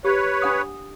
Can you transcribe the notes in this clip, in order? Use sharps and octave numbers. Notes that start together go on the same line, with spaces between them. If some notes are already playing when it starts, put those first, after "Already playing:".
G4 B4 C#5
D4 F#5 D#6